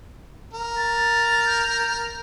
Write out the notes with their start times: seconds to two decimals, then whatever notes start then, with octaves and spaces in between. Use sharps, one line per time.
0.54 A#4
0.77 A6
1.46 G6